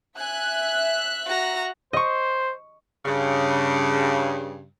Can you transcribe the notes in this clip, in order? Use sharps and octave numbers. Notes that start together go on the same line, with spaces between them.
E5 G#5 F#6
F#4 A#5
C5 D#5 C#6
G2 C#3